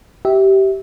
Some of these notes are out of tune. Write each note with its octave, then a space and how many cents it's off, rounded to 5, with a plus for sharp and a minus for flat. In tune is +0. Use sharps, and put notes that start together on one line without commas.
G4 -20 E5 -15